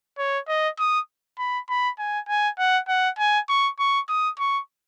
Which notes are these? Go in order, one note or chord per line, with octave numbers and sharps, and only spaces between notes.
C#5
D#5
D#6
B5
B5
G#5
G#5
F#5
F#5
G#5
C#6
C#6
D#6
C#6